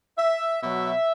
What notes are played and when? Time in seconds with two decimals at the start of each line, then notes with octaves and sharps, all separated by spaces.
0.18 E5
0.63 B2 F#3 E5